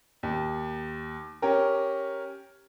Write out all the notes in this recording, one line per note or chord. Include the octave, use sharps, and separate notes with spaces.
D#2
C#4 G4 A#4